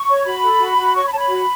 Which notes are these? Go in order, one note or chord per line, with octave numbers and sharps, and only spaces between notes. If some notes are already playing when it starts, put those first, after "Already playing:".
Already playing: C#6
C#5
F#4 B5
A4
F#4
F#4
C#5 C#6
B5
C#5 A5
B5
F#4